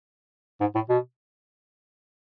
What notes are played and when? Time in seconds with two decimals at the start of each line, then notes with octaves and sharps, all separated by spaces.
0.60 G#2
0.75 A2
0.89 B2